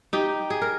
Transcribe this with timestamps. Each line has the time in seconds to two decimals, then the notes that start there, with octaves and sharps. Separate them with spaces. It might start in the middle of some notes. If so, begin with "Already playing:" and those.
0.13 D#4 G4
0.50 G#4
0.62 A#4